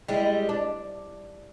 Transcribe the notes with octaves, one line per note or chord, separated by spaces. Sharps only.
G3 G#3 E4
D4